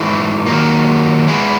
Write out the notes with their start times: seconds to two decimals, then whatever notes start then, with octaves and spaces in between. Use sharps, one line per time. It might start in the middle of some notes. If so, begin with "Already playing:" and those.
Already playing: G#2 E3 A3
0.46 D#3 F#3 A#3
1.28 G#3 B3 E4 G#4